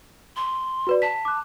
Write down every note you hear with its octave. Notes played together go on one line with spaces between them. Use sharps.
C6
F#4 B4 D5
A5 B6
D6 F#6